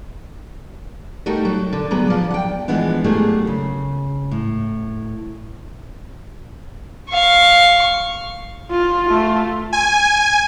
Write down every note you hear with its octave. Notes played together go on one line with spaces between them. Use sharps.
A3 D#4 F#4 G4 A#4
F#3
D3
D2 F#3 B3 G#4
F3 D5
F#5 G5
E3 F3 G#3 B3 D4
F#3 A3 A#3 D4 G4 G#4
C#3
A2
F5 C#6
F4
A3 F4
G#5